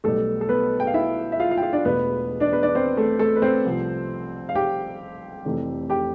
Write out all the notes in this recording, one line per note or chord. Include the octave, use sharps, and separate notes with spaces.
B1 B2 G3 A3 A4
A4
B3 B4
G5
F5
E4 E5
E5
F4 F5
F4 F5
G5
F4 F5
D4 D5
E1 E2 B2 A3 B3 B4
D4 D5
B3 B4
D4 D5
C4 C5
A3 A4
A3 A4
B4
C4 C5
C2 C3 F3 A3
F5
G4 G5
F1 F2 C3 E3 A3
G4 G5